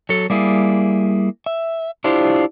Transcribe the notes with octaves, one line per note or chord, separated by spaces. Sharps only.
F#3 A4
G3 A#3 E4 G#4
E5
D4 E4 F4 G4 C5